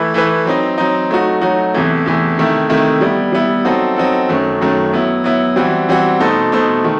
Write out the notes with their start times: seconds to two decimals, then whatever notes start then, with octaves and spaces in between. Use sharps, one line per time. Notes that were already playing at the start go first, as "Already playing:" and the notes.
Already playing: E3 A3 E4 B4
0.14 E3 A3 E4 B4
0.45 F#3 C4 D#4
0.78 F#3 C4 D#4
1.10 F#3 A3 D#4 F#4
1.41 F#3 A3 D#4 F#4
1.74 E2 C3 E3 A3
2.06 E2 C3 E3 A3
2.38 C3 D#3 A3 E4
2.69 C3 D#3 A3 E4
3.01 G3 B3 E4
3.33 G3 B3 E4
3.65 F#3 C4 D#4 F#4 A4
3.96 F#3 C4 D#4 F#4 A4
4.29 F#2 D#3 F#3 A3
4.61 F#2 D#3 F#3 A3
4.93 F#3 B3 E4
5.24 F#3 B3 E4
5.56 E3 G3 C4 F#4
5.89 E3 G3 C4 F#4
6.20 B2 A3 D#4 A4 C5
6.52 B2 A3 D#4 A4 C5
6.84 D#3 A3